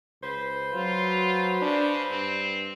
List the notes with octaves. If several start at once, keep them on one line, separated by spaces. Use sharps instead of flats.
C#2 B4 C5
F#3 F4
C#3 D4
G2 C4